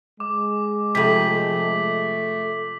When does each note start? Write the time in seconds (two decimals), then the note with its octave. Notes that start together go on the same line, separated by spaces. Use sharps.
0.20 G#3 D6
0.95 F2 C3 A3 B6 F#7